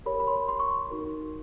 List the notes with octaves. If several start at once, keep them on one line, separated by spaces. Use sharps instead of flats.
G4 A#4 C#5 B5
B5
C6
C6
C#6
C6
D#4 F#4 A#4